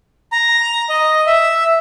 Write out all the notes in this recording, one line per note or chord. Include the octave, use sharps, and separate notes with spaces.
A#5
D#5
E5